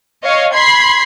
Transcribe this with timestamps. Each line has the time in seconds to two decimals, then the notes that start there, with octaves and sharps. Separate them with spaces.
0.24 C#5 D#5 F5
0.53 B5 C6 G#6 C7